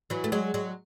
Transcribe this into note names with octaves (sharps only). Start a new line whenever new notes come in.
E3 F#3
A3
F#3 G#3
F#3 G#3